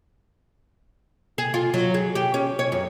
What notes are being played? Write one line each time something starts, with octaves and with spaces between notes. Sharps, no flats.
G#4
F4
F#3
G#4
G4
C#4
C#5
F#2